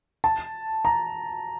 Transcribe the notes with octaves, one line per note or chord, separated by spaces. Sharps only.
A5
A#5